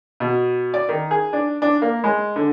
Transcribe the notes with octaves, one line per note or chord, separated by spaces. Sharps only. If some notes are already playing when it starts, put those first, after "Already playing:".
B2
D5
D#3
G#4
D4
D4
A#3
G#3
D3